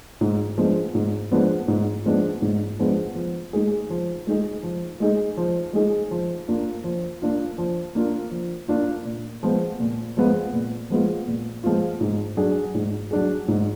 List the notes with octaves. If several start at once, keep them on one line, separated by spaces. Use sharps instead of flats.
G#2
F3 G#3 B3 D4
G#2
F3 G#3 B3 D4
G#2
F3 G#3 B3 D4
G#2
F3 G#3 B3 D4
F3
G#3 D#4 G#4
F3
G#3 D#4 G#4
F3
G#3 D#4 G#4
F3
G#3 D#4 G#4
F3
A#3 D4 F4
F3
A#3 D4 F4
F3
A#3 D4 F4
F3
A#3 D4 F4
A#2
F3 G#3 B3 F4
A#2
F3 G#3 B3 F4
A#2
F3 G#3 B3 F4
A#2
F3 G#3 B3 F4
G#2
F#3 D4 G#4
G#2
F#3 D4 G#4
G#2